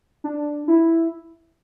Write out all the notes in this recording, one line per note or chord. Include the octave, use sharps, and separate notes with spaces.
D4
E4